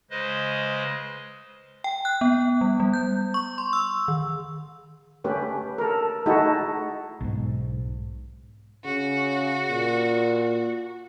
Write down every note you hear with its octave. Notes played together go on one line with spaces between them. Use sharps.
C#3 G#3 B4 C5 D#5
G5
F#6
B3
G3
G3
G6
C#6
C6
E6
D#3
A3 C#4 G4 B4
A4 A#4
A3 D#4 E4 F#4 G#4 A4
B1 G#2
C#3 F#4
A#2